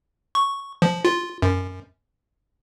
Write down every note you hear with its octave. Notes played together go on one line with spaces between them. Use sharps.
C#6
F3
F4
F#2